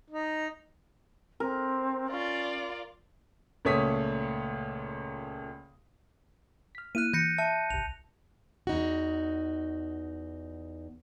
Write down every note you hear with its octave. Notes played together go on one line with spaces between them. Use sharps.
D#4
C4 A#4
C#4 F4 D5
C#2 A#2 A3 C#5 D#6 B6
F6 B6
A#3 E4 F6 F#6 D#7
E3 G6 A#6 C#7
E5 A5
G1 C2 F7
E2 D#4 F#4